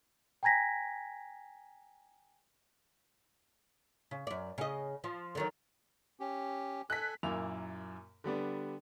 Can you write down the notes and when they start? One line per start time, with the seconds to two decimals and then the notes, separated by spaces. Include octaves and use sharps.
0.43 G5 G#5 A#5 G#6 A#6 B6
4.11 C#3
4.27 F#2 D5
4.58 C#3 D#5
5.04 F3
5.35 D3 D#3 F#3
6.20 C#4 G4
6.90 A4 G#5 F#6 B6
7.23 F#2 A#2 A#3 E4 F7
8.24 D3 G3 B3 D4